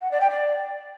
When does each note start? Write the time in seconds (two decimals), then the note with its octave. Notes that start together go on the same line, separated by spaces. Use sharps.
0.02 F#5
0.11 D5
0.21 G5
0.30 D5